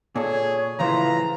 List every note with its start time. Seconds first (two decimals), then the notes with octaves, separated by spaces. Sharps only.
0.16 A#2 G#4 A4 C#5
0.79 A2 C#3 E3 F3 C5 F5 A#5